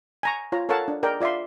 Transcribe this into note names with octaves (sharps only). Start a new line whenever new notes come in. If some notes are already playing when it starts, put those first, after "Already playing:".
G#5 A#5 C#6
F4 C#5 A#5
A4 A#4 C#5 F5 F#5 A5
D4
G#4 A#4 D5 D#5 G5
F4 D5 E5 F5 C6